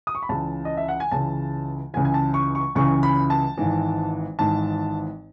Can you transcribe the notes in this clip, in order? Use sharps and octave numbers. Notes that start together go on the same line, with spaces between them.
D#6
C#6
B5
C#2 C#3 E3 A5
D#5
E5
F#5
G#5
C#2 C#3 E3 A5
C#2 C#3 E3 G#5
G#5
A5
C#6
C#6
C#2 C#3 E3 C#6
B5
A5
G#1 G#2 E3
G#1 G#2 E3 A5